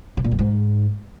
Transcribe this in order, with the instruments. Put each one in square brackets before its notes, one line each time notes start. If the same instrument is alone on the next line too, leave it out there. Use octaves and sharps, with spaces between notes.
[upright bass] C#3
A#2
F#2
G#2